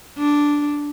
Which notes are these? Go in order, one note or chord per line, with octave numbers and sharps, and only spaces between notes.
D4